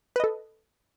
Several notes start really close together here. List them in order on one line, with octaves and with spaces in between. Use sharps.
B4 D#5 A4